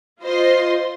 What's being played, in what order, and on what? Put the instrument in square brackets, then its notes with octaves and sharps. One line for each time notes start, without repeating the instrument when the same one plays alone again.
[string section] F4 C5 D#5 C6